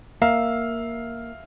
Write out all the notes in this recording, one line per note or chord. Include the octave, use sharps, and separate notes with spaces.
A#3 E5 F5 E6